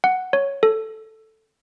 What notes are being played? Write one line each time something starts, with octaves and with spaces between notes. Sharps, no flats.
F#5
C#5
A4